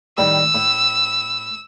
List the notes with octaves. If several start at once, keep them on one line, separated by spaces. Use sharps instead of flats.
A2 D#3 G3 E6
A2